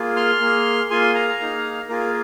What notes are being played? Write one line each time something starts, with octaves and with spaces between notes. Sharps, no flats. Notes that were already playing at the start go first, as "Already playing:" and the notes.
Already playing: A#3 F4 G#4
C6 F6
A#3 G#4
A#3 F4 G#4 G#5 C6
F5 A#5
A#3 D#4 G#4
A#3 F4 G#4 A#4